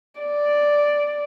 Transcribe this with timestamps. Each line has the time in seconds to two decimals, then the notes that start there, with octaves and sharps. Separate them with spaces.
0.20 D5